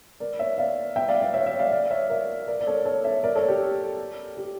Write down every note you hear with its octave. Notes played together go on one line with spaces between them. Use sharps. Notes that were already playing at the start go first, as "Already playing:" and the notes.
A#4 D5
C#5 E5
D5 F5
E5 G5
D5 F5
D5 F5
C#5 E5
C#5 E5
D5 F5
D5 F5
C#5 E5
A#4 D5
A#4 D5
D5
A4 C#5
A4 C#5
C#5 E5
A#4 D5
A4 C#5
G4
G4